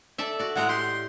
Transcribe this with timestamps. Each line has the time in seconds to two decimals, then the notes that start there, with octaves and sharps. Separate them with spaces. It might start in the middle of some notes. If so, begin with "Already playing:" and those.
0.18 A4 D5 E5
0.39 F#4 D5
0.56 A2 G#3 F#5 A#5
0.69 G4 C6